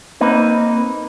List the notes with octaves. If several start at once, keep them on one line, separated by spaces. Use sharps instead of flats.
A#3 C4 D#4 B4